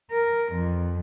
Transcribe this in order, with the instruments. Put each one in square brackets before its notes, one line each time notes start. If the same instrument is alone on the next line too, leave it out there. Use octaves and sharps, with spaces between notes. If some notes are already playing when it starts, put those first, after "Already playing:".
[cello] A#4
F2